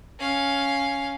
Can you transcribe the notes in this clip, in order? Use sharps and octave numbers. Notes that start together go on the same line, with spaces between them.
C#4 F5